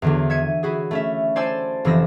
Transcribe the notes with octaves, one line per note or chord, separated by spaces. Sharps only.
E2 D3 F#3
E5 G#6 C#7 D#7
E4 F#4 G#4
A3 C#4 E5
C5 D5 G#5 A5 C6 E6
F1 E3 C4 E6 A#6